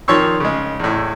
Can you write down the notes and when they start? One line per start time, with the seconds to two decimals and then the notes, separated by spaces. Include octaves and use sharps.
0.08 D#3 F3 C#5 C6 C#6 E6
0.40 C#3 G#3
0.80 E2 A2